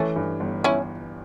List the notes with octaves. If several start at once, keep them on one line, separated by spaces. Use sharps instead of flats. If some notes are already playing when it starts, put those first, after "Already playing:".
Already playing: E3 A3 C#4
G2
G1
G1 C#4 E4